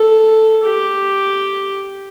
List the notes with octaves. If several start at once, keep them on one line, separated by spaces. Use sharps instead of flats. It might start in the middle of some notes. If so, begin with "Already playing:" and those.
Already playing: A4
G4